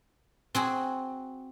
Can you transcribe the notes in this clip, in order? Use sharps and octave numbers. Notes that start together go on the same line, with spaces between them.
C4 F#4 G#4